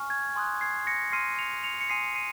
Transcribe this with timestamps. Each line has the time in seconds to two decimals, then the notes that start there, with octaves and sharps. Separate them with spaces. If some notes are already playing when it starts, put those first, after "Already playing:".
Already playing: G#5 C#6 F6
0.10 G#6
0.35 G#5 C6 D#6 F#6
0.61 G#6 C7
0.87 A#6 C#7
1.12 C6 F6 C7 D#7
1.39 C#7 F7
1.64 C#7 F7
1.81 C#7
1.89 G#5 C6 D#6 C7 D#7
2.16 C7 D#7